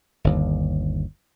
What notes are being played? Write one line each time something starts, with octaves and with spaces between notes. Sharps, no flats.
G1 D#2